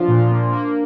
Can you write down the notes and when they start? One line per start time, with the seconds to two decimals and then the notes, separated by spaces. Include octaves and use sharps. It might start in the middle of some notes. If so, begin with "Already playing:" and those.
Already playing: F3 D4 F4
0.08 A#2
0.30 A#3
0.52 A#3